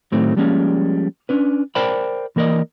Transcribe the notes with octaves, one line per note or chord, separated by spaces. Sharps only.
A2 D#3 F#3 A3 C4
F3 G3 G#3 A#3 C#4
C#4 D4 B4
A#4 C5 D5 G5 A5 B5
E3 A#3 A#4 D5 D#5